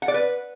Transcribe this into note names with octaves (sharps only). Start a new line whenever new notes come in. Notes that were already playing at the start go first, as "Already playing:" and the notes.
F#5
D5
B4